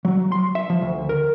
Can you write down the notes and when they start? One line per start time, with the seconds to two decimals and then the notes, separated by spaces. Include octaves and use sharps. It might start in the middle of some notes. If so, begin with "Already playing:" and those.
0.05 F#3
0.32 C6
0.55 E5
0.70 F3
0.82 D2
1.09 A#4